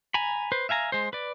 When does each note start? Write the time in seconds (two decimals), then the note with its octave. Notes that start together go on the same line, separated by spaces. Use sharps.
0.14 G#5 A#5 B5
0.52 B4 C5
0.69 E5 F5 G#5 A#5
0.92 G#3 C5
1.13 B4 D5